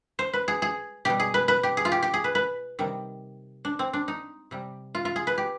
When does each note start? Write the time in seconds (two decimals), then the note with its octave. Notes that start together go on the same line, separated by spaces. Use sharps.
0.19 C5
0.33 B4
0.48 G#4
0.62 G#4
1.05 B2 G3 G4
1.20 G#4
1.34 B4
1.48 B4
1.63 G4
1.77 G#4
1.85 F4
1.92 G4
2.03 G4
2.14 G#4
2.24 B4
2.35 B4
2.79 C3 D#3 G3
3.65 D4
3.79 C4
3.93 D4
4.08 D#4
4.51 C3 G3
4.95 F4
5.05 F4
5.16 G#4
5.27 B4
5.38 G4